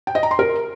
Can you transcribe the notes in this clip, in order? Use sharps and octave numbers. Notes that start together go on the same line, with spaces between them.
G5
D#5
A#5
C6
A#4